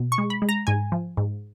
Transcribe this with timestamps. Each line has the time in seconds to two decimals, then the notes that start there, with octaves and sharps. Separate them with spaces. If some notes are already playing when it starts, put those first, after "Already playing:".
Already playing: B2
0.12 C#6
0.18 G#3
0.30 B5
0.42 G#3
0.49 A#5
0.67 G#2 G#5
0.92 F3
1.17 G#2